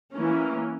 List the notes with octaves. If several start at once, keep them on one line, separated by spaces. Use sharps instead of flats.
E3 A#3 C#4